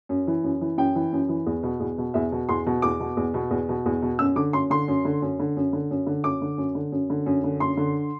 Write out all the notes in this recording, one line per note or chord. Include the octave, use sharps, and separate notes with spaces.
F#2
E3
F#2
E3
F#2 G5
E3
F#2
E3
E2
B2
E2
B2
E2 E5
B2
E2 C6
B2
E2 D6
B2
E2
B2
E2
B2
E2
B2
F#2 E6
D3 D6
F#2 C6
D3 C6
F#2
D3
F#2
D3
F#2
D3
F#2
D3
F#2 D6
D3
F#2
D3
F#2
D3
F#2
D3
F#2 C6
D3